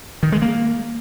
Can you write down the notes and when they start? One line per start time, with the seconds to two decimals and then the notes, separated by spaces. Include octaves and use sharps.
0.23 D#3
0.32 G#3
0.42 A#3